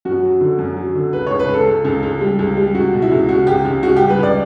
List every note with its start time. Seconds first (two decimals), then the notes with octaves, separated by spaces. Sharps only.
0.05 F#2 F#4
0.23 F#3
0.41 D3
0.59 F#2
0.77 F#3
0.95 D3
1.13 C#2 B4
1.27 C#2 C#5
1.40 B4
1.49 C#2 A4
1.67 C#2
1.85 C#2
2.03 C#2
2.21 G3
2.39 C#2
2.57 G3
2.74 C#2 F#4
2.93 B2
3.02 E4
3.11 C#2
3.29 C#3 F#4
3.47 C#2 G4
3.65 C#2
3.83 C#3 F#4
3.96 G3 G4
4.10 B4
4.19 C#2 D5